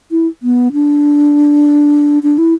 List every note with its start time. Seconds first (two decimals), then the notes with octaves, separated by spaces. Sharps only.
0.11 E4
0.43 B3
0.73 D4
2.23 D4
2.38 E4